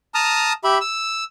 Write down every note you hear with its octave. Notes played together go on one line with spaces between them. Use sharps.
A5 A#5 D#6 F6
G4 E5 B5
E6